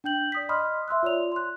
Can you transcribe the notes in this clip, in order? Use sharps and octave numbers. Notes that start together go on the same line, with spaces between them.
D4 G5 G6 F#7
D5 D#6 B6
D#5 B5 C6 D#6 F6
E5 C6 E6 F#6
F4 C#5 D5 F7
C6 F#6